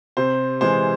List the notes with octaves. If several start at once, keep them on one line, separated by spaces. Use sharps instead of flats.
C3 C5
E3 G#3 C5